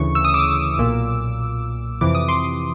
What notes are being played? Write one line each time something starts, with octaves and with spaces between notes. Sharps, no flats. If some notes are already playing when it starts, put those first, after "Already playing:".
Already playing: D2 C#3 E3 C#6
E6
D#6
D6 E6
B1 A#2
F2 C3 E3 D6
D#6
C6 D6